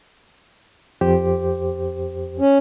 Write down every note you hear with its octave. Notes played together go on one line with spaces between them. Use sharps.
F2 G4 C5
C#4